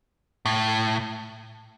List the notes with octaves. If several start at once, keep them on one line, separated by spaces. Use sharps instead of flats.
A2